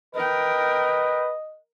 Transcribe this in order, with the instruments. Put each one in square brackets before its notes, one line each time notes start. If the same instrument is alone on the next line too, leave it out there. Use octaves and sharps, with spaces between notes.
[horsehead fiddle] A#4 G5 [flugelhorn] B4 [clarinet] D#5